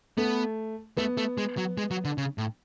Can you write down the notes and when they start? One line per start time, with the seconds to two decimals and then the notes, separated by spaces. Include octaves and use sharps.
0.18 A3 B3
0.97 A3 B3
1.17 A3
1.38 G#3
1.57 F#3
1.78 G#3
1.91 F#3
2.05 D3
2.18 C#3
2.38 A2